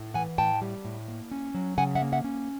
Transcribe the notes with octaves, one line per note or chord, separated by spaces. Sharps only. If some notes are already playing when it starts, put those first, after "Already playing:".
Already playing: A2
E3 F#5 G#5
A2 G5 A5
G3
A2
A#3
C#4
F#3
C#3 F#5 G#5
E5 F#5
A#3
E5 F#5
C#4